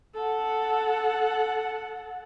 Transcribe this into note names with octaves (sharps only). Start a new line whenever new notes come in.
A4 F#5